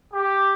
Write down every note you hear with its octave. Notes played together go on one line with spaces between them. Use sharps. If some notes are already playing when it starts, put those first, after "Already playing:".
G4